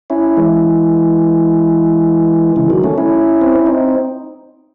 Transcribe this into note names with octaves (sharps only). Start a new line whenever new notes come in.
C#4 E4
E3 G#3
C#3 E3
D#3 F#3
A3 C#4
C#4 E4
C4
C#4
C4 D#4